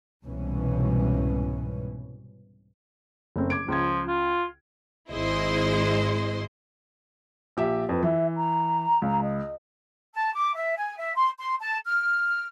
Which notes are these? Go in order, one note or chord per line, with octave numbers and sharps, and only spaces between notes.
C2 G#2 B2 E3 C#4
F#1 A3 C4
D6 G#6 D7
C#2 F3 G#6
F4
G#1 G#3 E4 C5 D#5 C6
A#1 G4 E5
F2 B4
E3 E5
A#5
C#2
D#5
A5
D6
E5
G#5
E5
C6
C6
A5
F6